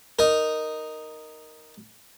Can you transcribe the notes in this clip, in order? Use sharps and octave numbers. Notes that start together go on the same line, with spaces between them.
D#4 A#4